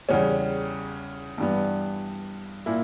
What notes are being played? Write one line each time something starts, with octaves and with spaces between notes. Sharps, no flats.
E2 C#3 G3 C#4
G2 E3 G3 B3
A#2 A#3 E4